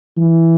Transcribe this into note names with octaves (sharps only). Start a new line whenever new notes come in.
E3